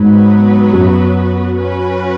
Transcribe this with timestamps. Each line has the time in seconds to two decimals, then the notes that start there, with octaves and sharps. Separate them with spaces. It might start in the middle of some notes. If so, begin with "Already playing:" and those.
Already playing: G#2 F#3 B3 F#4 B4
0.73 F#2
1.58 C#4 F#4 B4